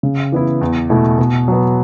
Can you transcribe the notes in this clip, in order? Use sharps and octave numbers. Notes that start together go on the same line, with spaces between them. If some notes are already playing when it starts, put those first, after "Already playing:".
C#3
E3 B3 E4
E2
B2 A3 E4
B2
F#3 B3